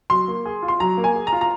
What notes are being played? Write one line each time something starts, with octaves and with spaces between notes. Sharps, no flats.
F#3 C6
A#3
G#4
F4
C6
F#3 A#5
A#3
G#5
G#4
A#5
F4
A#5